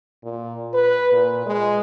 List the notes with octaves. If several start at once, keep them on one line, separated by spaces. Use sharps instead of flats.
A#2
B4
A#2
G#3